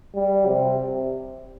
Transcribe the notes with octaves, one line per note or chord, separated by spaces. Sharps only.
G3
C3